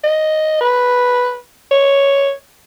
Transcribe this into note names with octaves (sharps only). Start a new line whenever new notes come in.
D#5
B4
C#5